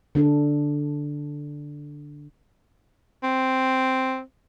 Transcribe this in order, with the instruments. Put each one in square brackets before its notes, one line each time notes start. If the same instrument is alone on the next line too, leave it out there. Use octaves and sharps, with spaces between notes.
[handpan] D3 D4 A4
[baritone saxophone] C4